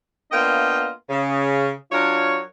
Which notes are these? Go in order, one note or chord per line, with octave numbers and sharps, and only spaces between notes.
A#3 B3 D4 F4 D#5 G5
C#3
F#3 D4 F4 A#4 C#5